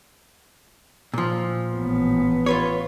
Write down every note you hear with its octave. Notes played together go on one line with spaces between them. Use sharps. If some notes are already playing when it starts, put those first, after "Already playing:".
A#2 F3
A1 B3
F4 B4 C#5